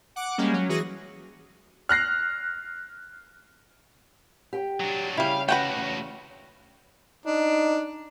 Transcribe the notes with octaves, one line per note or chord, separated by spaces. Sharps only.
F#5 D6
G3 G#3 A#3 C#4 G#4
F#3 C#4
E3 F#4 G#4 A#6
F6 F#6 A#6 C7
G4 G5
F#3 D4
C#3 G3 C#4 E4 F5
A3 F#4 B4 F#5 G5
E2 C#3
D4 D#4